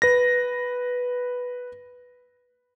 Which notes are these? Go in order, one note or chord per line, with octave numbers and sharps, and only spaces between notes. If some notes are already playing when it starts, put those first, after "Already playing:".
B4 A#6